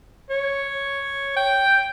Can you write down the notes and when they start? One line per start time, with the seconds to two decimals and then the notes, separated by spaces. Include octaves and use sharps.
0.30 C#5
1.36 G5